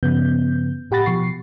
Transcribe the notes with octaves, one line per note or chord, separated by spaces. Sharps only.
G2 C#3 F3 B3 G6
A2 G4 F#5 B5 A6 A#6
B2 F3 C#6 C7